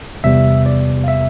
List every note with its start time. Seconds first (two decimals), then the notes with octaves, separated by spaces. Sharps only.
0.24 E2 C3 G3 B3 E5
0.66 D5
1.04 F5
1.08 E5